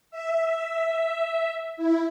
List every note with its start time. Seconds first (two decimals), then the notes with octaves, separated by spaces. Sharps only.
0.11 E5
1.77 E4